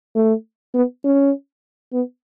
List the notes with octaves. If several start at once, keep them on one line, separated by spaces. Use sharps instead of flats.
A3
B3
C#4
B3